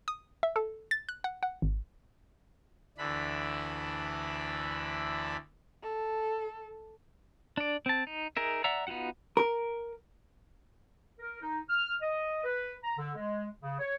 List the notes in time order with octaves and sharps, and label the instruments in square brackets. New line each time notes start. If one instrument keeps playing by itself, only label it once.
[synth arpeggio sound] D#6
E5
A4
A6
F#6
F#5
F#5
G#1
[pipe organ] D2 D3 E3 D4 B5
[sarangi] A4
[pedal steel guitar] D4 D5
C4 A5
D#4
D#4 G#4 A#4 E5
D5 E5 F#5 A#5 E6
B3 D#4 F4 F#4 F#5
[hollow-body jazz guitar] A#4
[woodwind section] A#4
D#4
F6
D#5
B4
A#5
D3
G#3
C#3
C#5